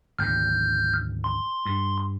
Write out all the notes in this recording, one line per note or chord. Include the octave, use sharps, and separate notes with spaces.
G#1 D2 B2 F6 G6
C6
G2